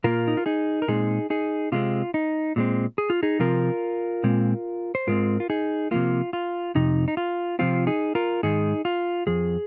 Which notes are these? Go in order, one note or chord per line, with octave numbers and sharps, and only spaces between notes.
A#2 A#3 F4 A#4
D#4
F4
D#4 G#4
A#4
A#2 G#3 C4 D#4 G#4
D#4 G#4
C3 G#3 C4 F4
D#4
A#2 G#3 C4
G#4
F4
D#4 G#4
C3 F3 C4 F4 A#4
A#2 G#3 C4
C5
G#2 G#3 C4 F4 A#4
F4
D#4 G#4
C3 F3 A#3 F4
F4
F2 C3 D#4
D#4
F4
C3 F3 C4 F4
D#4 G#4
F4 A#4
G#2 D#3 G#3 D#4 G#4
F4
F2 F3 G#4